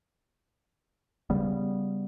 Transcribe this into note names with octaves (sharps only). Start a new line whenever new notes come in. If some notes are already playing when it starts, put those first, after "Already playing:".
C#3 G3 B3